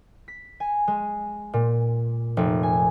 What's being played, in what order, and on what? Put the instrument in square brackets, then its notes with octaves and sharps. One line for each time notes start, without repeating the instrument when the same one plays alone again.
[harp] B6
G#5
G#3
A#2
F1
G#5